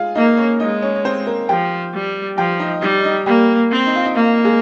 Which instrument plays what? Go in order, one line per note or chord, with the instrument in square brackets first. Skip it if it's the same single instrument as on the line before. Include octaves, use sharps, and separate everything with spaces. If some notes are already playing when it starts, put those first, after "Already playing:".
Already playing: [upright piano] G#3 F4 G#4 F5
[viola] A#3 [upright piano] D#4 D#5
[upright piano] C#4 C#5
[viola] G#3 [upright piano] D#4 D#5
[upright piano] C#4 C#5
C#5
C4 C5
A#3 A#4
[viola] F3 [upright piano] G4 G5
[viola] G3
[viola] F3 [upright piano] G4 G5
[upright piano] D#4 D#5
[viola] G3 [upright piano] D#4 D#5
[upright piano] D#4 D#5
[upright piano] G3 G4 [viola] A#3
[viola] C4
[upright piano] D#4
F4
D#4
[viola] A#3 [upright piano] F4
[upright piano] G#3 G#4